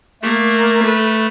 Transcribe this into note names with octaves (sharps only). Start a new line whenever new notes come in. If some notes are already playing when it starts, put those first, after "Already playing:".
A3 A#3 A#4
A4 B4